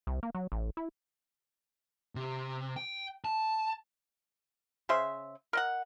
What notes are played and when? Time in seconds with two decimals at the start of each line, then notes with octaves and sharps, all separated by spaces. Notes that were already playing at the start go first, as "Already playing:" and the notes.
0.07 C2
0.23 A#3
0.35 F#3
0.52 A1
0.77 E4
2.15 C3
2.76 G5
3.25 A5
4.89 C#3 G#4 C5 E5
5.53 A#4 D#5 F#5